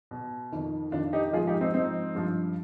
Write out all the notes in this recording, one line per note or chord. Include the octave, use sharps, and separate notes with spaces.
B2
F2 D#3
F2 D#3 D4 F4
D#4 G4
G#2 F3 F4 G#4
D#4 G4
C4 D#4
G#2 F3 C4 D#4
G2 F3